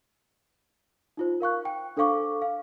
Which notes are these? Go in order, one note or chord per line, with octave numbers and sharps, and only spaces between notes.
D#4 F4 C5
A#4 F5 C#6 F#6
G5
D4 A4 C5 F5 C#6 D6
F5